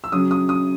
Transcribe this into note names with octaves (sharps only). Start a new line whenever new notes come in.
E6
C#3 F#3 D#6
D#6
D#6